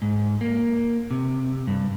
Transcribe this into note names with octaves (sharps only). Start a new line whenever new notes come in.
G#2
A#3
C3
G2